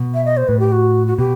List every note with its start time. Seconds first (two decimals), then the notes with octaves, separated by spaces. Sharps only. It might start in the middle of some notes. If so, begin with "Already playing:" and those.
Already playing: B2
0.14 E5
0.25 D#5
0.37 C5
0.48 A2 B4
0.59 G4
0.72 F#4
1.07 F#4
1.18 B2 G4